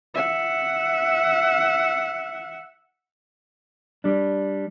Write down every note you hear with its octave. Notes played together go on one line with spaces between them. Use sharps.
E5 F#5
G3 D4